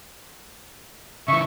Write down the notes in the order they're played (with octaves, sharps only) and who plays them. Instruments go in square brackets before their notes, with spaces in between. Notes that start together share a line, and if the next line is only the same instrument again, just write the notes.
[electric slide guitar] C#3 E3 [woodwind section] E5 C#6